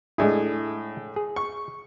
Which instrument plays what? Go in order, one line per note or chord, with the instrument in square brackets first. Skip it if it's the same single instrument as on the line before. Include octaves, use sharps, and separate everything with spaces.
[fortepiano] A2 G#4 [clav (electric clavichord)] G#3 D4 E4
[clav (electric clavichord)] G#4
[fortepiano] C#6